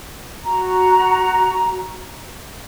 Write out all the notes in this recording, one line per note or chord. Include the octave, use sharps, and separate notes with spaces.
F#4 A#5